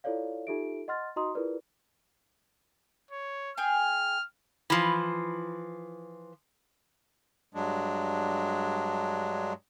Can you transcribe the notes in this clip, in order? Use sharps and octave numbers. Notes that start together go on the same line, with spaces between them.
E4 F4 A4 C#5 D5 F5
D#4 F4 G4 A4 E5 D7
D#5 F#5 C6 F6 A6
D#4 F#4 D#5 A#5 C6 D#6
E4 F4 G#4 A#4 B4 D5
C#5
G#4 G5 G#5 F6
E3 F3
G2 F#3 G#3 D4